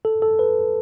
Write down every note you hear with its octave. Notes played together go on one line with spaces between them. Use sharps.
A4
A4
B4